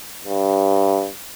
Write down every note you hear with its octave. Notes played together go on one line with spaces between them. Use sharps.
G2